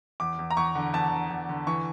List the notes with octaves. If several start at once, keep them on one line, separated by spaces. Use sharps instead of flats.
E2 D6
E2
A#5
E2 C#6
D3
E2 A5
D3
E2
D3
E3 C#6